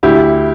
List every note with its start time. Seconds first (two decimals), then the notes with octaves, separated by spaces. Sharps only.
0.03 D2 E4 G4